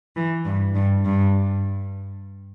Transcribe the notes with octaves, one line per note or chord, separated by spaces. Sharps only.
E3
G2
G2
G2